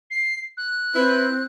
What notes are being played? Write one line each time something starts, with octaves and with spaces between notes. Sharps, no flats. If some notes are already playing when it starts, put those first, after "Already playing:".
C7
F#6
C4 E4 B4